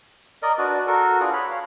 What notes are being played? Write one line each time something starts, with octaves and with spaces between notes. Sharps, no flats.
A#4 D5 D#5
D4 F#4 B4 D5
F#4 A4 A#4
D4 F4 G#4 B4
C#5 B5
C#5 F5